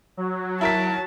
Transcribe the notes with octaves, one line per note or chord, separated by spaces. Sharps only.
F#3
E4 A#4 A5 B6